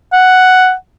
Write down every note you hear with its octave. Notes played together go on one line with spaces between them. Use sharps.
F#5